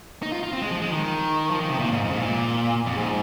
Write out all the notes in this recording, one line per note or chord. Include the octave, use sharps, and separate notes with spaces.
D#4
F4
F4
C4
G#3
F3
G#3
D#3
F3
D#3
C3
A#2
G#2
F2
G#2
A#2
F2
G#2